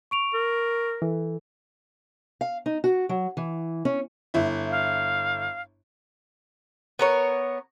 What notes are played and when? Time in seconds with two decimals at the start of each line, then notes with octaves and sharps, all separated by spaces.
0.11 C#6 D7 F7
0.34 A#4
1.02 E3 A4
2.41 F5
2.66 D#4
2.84 F#4
3.09 F#3
3.37 E3
3.85 C#4
4.34 G1 E4
4.71 F5
6.99 B3 A#4 C#5